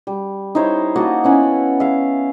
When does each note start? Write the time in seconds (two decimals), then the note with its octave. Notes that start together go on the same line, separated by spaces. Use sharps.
0.07 G3
0.55 D#4 E4 C5 C#5
0.96 A#3 F#4 D#5 A5
1.24 B3 C#4 E4 F#5
1.80 E5 F5